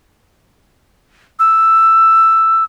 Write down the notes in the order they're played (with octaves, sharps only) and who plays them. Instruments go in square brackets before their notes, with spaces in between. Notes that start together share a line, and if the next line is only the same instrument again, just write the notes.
[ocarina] E6